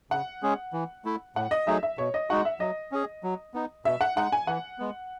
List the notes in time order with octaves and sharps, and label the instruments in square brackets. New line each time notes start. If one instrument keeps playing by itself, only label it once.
[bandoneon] C#3 [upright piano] F#5
[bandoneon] G#3 C#4 G#4
E3
A3 E4
[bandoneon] A2 [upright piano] F#5
[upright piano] D#5
[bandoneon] F#3 A3 D#4 G#4 [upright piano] E5
[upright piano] E5
[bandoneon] B2 [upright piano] C#5
[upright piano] D#5
[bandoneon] G#3 D#4 F#4 [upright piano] F#5
[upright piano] E5
[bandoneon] F#3 [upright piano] D#5
[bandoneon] C#4 G#4
F#3
B3 D#4
[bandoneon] B2 [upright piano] E5
[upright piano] F#5
[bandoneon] G#3 D#4 [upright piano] F#5
[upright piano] G#5
[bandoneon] E3 [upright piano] F#5
[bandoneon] G#3 B3